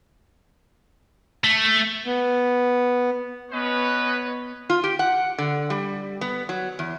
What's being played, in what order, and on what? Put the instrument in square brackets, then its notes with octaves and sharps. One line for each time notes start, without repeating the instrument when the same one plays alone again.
[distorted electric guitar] A3
[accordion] B3
[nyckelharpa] B3 C#5 [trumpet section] C#4 B4 D#5
[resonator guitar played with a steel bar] F4
G4
F#5
D3
G3
B3
F#3
E2